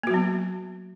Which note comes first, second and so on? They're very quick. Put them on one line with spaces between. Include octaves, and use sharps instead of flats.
A#3 F#4 F#3 B3